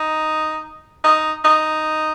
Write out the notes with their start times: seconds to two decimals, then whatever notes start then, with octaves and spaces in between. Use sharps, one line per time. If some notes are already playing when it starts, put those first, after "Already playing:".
Already playing: D#4
1.04 D#4
1.44 D#4